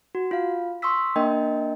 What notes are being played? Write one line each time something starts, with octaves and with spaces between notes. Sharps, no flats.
F#4
F4 F5
C6 C#6 D#6 E6 B6
A#3 D4 A#4 D#5 G5